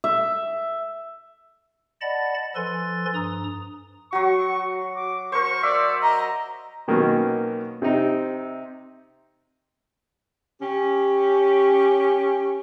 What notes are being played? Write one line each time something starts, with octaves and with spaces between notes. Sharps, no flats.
E5
D5 D#5 F#5 A5 B5 A6
F3 A4 B4 G#5 C6 A6
G2 A#5 D#6
F#3 F#4 C#6
D6
A#4 C5 C#6
D5 E5
D#5 A#5
B2 D#3 F#3 A#3 B3 C#4
C3 C4 D#4
C#4 G4